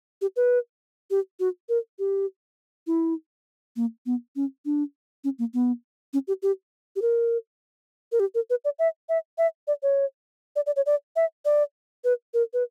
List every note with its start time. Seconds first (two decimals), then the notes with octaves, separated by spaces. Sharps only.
0.21 G4
0.36 B4
1.11 G4
1.40 F#4
1.69 A#4
1.99 G4
2.87 E4
3.76 A#3
4.06 B3
4.36 C#4
4.65 D4
5.24 C#4
5.39 A#3
5.54 B3
6.13 C#4
6.28 G4
6.42 G4
6.96 G4
7.02 A#4
8.12 A#4
8.20 G4
8.35 A#4
8.50 B4
8.65 D5
8.79 E5
9.09 E5
9.38 E5
9.67 D5
9.83 C#5
10.56 D5
10.66 D5
10.76 C#5
10.86 D5
11.16 E5
11.45 D5
12.04 B4
12.34 A#4
12.53 B4